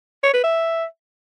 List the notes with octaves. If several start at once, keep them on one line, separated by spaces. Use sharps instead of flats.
C#5
B4
E5